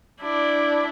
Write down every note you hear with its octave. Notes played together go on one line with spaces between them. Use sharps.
D4 E4